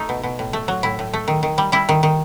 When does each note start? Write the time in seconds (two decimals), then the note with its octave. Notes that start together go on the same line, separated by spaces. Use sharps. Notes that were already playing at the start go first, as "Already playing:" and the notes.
Already playing: A3 D#4
0.09 B2
0.23 B2
0.39 A2
0.53 A3
0.68 F#3
0.83 A2 E4
0.99 A2
1.13 A3
1.28 D#3
1.43 D#3
1.58 G3
1.72 G3 E4
1.89 D#3
2.03 D#3